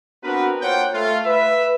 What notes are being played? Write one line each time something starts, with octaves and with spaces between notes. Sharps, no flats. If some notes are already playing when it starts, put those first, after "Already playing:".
B3 C4 D4 F#4 A#4 B4
A#3 F4 C5 C#5 F#5 G5
A3 F4
B4 E5